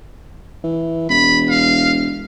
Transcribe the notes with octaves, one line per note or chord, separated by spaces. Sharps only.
E3
E1 B5
F5